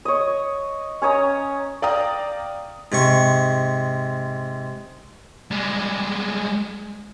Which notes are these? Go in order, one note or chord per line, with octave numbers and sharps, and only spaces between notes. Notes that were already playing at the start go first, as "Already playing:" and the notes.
C#5 D#5
C#4 C#5 D#5 A#5
D5 F5 G5 A#5 D#6
G#2 C3 C#6
G3 G#3